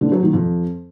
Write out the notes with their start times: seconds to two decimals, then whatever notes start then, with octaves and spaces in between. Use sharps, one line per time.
0.01 D3
0.12 F#3
0.23 D#3
0.33 F2